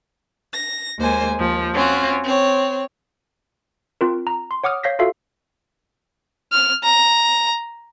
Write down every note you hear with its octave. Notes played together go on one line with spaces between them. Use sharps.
A#6
D#2 G#3 A#3 C5 G#5
D#2 F3
C4 C#4 F4 F#4
C4 C#5
C4 F4 A#4
A#5
C6
C#5 F#5 D6 D#6 F6
C#5 F5 G6 A#6 B6
F4 F#4 A4 E5 F5
F6
A#5